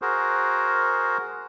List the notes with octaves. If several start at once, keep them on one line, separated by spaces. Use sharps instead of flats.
F#4 G#4 A#4 C5